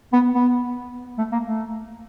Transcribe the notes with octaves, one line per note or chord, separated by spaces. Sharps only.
B3
B3
A3
A#3
A3